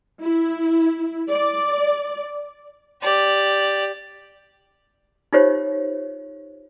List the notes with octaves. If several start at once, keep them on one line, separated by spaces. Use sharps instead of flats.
E4
D5
G4 D5
D#4 F4 G4 C5 C#5